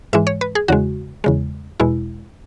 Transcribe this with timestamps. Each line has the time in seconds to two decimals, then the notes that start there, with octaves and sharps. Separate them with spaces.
0.13 G#2 E3 G#3 E5
0.27 C#5
0.41 B4
0.55 G#4
0.68 E2 C#3 G#3 F#4
1.24 E2 C#3 G#3
1.80 E2 B2 G#3 E4